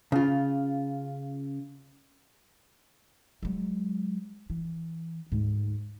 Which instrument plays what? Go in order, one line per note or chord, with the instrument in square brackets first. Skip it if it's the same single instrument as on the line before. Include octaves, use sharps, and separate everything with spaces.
[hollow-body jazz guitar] C#3 F4
[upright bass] F#3 G#3
E3
D2 G#2